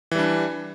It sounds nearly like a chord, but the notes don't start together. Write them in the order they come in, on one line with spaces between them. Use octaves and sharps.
E3 G3 D4